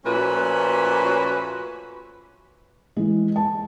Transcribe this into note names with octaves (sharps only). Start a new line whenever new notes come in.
A#2 F3 A3 C#4 F#4 B4
E3 G#3
A5